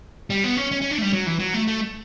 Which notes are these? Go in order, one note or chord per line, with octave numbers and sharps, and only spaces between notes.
G3
B3
C#4
C#4
C#4
D4
A3
G3
F#3
E3
F#3
A3
A3